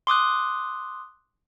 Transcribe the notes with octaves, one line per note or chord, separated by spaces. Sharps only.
C6 D6 D#6 F#6